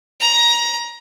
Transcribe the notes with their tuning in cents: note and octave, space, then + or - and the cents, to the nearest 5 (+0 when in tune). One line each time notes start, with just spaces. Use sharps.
A#5 +20